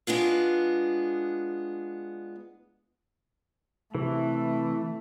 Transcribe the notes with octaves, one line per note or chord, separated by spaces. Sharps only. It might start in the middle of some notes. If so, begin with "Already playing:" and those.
G#3 B3 D4 F4
C3 E3 A3